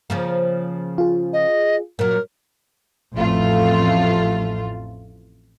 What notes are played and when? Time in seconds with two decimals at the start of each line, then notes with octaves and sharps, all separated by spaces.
0.10 C#3 F3 A#3
0.98 F4 G#4
1.33 D#5
1.99 A#2 F#3 A#4
3.15 A1 F2 A3 F4